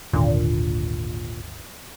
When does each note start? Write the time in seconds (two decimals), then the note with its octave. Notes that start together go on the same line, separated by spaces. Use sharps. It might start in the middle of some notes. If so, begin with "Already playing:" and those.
0.13 G#1 D#2 A#2 D3